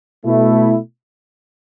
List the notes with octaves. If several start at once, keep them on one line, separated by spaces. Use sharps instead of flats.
B2 A3 E4